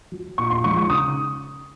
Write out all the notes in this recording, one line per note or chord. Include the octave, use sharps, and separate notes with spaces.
F#3
A#2 C#6
C6
F3 G#3 C#6
C#6
C#3 D#6